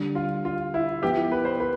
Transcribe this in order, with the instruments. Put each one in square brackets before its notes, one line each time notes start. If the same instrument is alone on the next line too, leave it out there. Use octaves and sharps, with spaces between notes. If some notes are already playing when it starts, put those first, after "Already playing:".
Already playing: [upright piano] D3 G3 D4
[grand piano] F4
F4
E4
[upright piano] F3 B3 E4 [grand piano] G4
[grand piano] B4
C5
B4